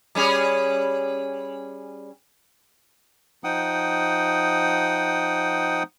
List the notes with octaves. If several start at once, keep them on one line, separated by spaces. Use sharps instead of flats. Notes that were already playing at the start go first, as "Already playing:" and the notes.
G3 C#4 G#4
F3 D#4 F#5 G5 D#6